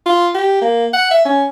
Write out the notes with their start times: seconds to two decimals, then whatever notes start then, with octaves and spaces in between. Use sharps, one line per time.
0.06 F4
0.35 G4
0.62 A#3
0.94 F#5
1.11 E5
1.26 C#4